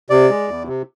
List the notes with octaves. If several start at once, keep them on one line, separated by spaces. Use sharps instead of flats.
C3 D5
G#3
E2
C3